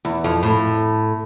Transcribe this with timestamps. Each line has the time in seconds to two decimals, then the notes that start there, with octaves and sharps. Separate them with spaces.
0.05 E2
0.24 F2
0.43 A2